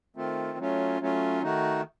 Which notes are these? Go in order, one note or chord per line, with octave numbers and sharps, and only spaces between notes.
D#3 A3 C4 F4
F#3 A3 C#4 F4
F#3 A3 C#4 F4
D#3 A3 D#4 F#4